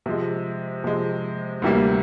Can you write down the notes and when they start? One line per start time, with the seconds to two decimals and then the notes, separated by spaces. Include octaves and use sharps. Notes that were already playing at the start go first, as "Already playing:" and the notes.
0.06 C3 F3 G#3
0.84 C3 F3 G#3
1.62 D2 C3 E3 G3 A#3